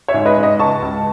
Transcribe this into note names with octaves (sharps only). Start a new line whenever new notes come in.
C#5 E5
G#2
B4 D#5
G#2
B4 D#5
C#2 A5 C#6
C#2